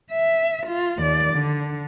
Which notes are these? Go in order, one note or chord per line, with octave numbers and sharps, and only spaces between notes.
E5
F4
D#2 D5
D3